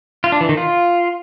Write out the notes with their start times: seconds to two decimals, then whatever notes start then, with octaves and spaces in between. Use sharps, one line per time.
0.24 F4
0.32 D4
0.41 E3
0.49 D#3
0.57 F4